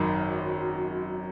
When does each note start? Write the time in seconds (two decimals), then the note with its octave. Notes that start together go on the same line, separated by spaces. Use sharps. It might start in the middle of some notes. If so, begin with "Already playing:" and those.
Already playing: G#1 F#2 D#3